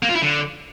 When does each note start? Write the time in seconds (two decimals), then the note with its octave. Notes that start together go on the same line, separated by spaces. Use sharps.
0.03 A#3
0.09 F4
0.16 E4
0.22 D3